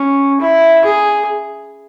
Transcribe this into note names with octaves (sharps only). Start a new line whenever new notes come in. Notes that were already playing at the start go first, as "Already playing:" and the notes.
Already playing: C#4
E4
G#4